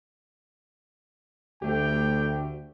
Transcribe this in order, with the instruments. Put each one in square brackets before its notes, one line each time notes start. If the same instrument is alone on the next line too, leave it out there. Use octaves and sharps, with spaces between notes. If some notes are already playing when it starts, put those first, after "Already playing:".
[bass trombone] D2 [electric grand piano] A3 G4 [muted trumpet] G5